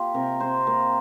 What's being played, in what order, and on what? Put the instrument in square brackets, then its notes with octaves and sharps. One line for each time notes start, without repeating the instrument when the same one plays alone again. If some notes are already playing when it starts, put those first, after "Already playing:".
Already playing: [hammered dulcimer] A#3 F4 G4
C3 A#4
C3 C5
A#3 A#4